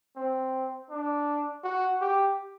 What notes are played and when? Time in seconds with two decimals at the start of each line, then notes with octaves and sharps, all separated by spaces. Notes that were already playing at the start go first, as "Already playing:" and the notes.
0.16 C4
0.90 D4
1.64 F#4
2.01 G4